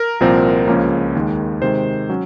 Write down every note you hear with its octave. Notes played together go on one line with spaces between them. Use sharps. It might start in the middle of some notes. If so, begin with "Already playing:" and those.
Already playing: A#4
C2 A#2 F3 C4
C#2 C#3 F3 A#3 C#4
D#2 D#3 G#3
C3 D#3 G#3 C5
F#3 C#4